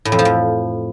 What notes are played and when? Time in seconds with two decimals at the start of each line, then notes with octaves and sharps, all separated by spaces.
0.05 A2
0.12 F2
0.19 F3
0.25 F2